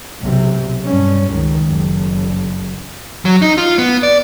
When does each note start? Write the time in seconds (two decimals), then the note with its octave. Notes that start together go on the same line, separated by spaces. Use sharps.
0.21 B1 C3
0.84 G2 C#4
1.30 C#2 D#3
1.66 F#1
3.25 F#3
3.42 D#4
3.58 F4
3.78 B3
4.03 D5